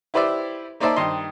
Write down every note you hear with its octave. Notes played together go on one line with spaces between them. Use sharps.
E4 G4 B4 C5 D5 E5
A#3 D#4 C5 D5 E5 A5
G2 D#3 D#5 C6